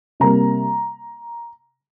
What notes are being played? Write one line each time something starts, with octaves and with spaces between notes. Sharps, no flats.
C3 G3 A#3 A#5